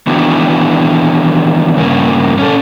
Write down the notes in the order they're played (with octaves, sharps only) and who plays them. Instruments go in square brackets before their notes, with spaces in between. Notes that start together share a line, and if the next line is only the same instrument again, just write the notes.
[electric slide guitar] D#3 E3 B3 D4 E4 F#4
G2 C#3 A#3
C#4 A4